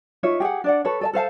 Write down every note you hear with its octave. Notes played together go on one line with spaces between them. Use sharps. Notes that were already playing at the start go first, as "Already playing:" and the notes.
D#4 F4 C#5 E5
G4 G#4 F5 F#5
D4 D5 F#5
A4 B4 C#5
A4 D#5 A5
A4 C5 F5 A5